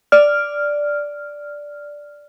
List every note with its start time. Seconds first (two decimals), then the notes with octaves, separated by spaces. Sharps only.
0.12 D5 F6